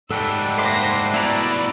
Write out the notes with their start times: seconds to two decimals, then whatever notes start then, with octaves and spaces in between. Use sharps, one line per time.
0.11 G#2 G3 A3 D4 A4 F#5 G5 E6
0.58 A#3 C5 E5 C6 D6 A#6
1.14 B2 A3 E4 D5 A#5